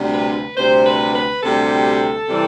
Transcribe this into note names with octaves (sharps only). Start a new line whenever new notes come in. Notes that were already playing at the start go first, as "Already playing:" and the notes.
Already playing: D2 C3 G3
B4
D2 C3 G3 C5
B4
B4
D2 C3 G3 A4
C3 E3 G3